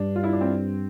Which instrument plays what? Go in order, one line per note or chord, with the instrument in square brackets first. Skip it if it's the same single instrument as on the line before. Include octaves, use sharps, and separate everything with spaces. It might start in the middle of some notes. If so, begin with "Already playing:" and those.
Already playing: [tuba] G2 [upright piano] D4
[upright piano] F4
E4
D4
C4